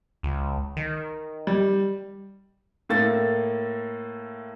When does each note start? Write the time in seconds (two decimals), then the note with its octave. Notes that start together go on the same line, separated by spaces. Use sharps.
0.23 C#2
0.77 D#3
1.47 G3
2.89 A2 A#3 A4 A6